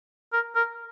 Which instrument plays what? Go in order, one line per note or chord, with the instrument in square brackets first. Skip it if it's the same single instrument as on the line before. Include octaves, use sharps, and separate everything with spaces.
[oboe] A#4
A#4